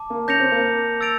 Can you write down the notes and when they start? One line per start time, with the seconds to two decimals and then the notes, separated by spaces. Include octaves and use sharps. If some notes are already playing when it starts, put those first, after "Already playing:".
Already playing: A5 D6
0.10 A#3
0.28 C#4 G6 A#6 C#7 F7
0.40 C4
0.52 A#3
1.01 E6 A6 D7 F7